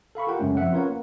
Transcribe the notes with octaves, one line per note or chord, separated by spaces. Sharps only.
A4 F5 B5 C#6
F4 G4 A#4 F#5 G5
F#2 C#3 G#3 A3 C#4
F3 C4 E5 F#5
C#4 F4 A#4 B4 C#5 F#5
A#3